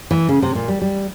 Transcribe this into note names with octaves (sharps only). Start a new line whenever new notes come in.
E3
C#3
C3
A#2
G3
G3